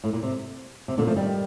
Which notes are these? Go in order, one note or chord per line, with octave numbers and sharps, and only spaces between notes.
A2
A#2
C3
C3
A#2 D3
F3 A3
D#3 G3